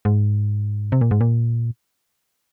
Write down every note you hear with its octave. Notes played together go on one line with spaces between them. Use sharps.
G#2
C3
A#2
G#2
A#2